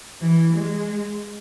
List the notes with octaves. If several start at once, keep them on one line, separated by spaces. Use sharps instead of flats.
E3
G#3